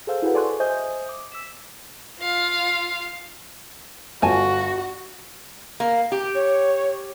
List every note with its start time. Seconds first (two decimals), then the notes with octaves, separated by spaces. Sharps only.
0.07 G#4 A4 C5 F5 E6 G6
0.22 E4 F#4 G#4 A4 B4 F#5
0.34 A4 D5 G#5 C6 C#6 F#6
0.60 C5 D#5 E5 G#5 D#6 G6
1.09 D6
1.32 E6 B6 E7
2.21 F4 F5
4.22 G1 F4 F#4 C#5 G#5 A5
5.80 A#3
6.12 G4
6.35 C#5